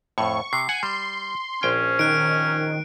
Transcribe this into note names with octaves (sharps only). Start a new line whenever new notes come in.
F2 A2 C#6
C3 C7
F#5 G#5
G3 C6
A#1 C#4 G5
D#3 F#6 D7